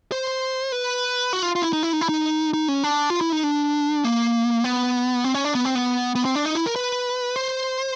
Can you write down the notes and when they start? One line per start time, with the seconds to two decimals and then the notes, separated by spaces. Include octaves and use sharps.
0.12 C5
0.72 B4
1.33 F#4
1.43 F4
1.55 F4
1.63 E4
1.73 D#4
1.83 E4
1.93 D#4
2.01 E4
2.09 D#4
2.54 D#4
2.68 C#4
2.83 D4
3.10 F4
3.21 E4
3.32 D#4
3.43 D4
4.04 A#3
4.64 B3
5.24 C4
5.34 C#4
5.45 D4
5.55 B3
5.65 C4
5.75 B3
6.15 B3
6.25 C4
6.35 D4
6.45 D#4
6.55 E4
6.66 A#4
6.76 B4
7.36 C5